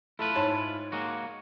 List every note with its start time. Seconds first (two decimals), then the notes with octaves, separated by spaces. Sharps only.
0.19 A3 E4 F4 B4
0.35 G#2 C#5 A5
0.92 G#3 A#3 F#4